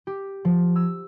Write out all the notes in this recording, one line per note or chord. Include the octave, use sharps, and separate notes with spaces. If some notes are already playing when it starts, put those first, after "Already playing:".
G4
F3
E6